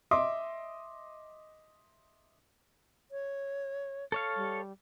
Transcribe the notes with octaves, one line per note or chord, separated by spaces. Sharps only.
D#5 E5 C6 D6
C#5
A4 C#5 F5
G3